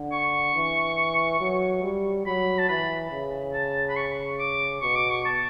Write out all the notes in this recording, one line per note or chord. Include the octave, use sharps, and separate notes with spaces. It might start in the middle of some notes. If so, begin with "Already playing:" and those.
Already playing: D3
C#6
E3
F#3
G3
F#3 B5
A5
E3 B5
C#3
A5
B5
C#6
D6
B2 C#6
D6
C#6
A5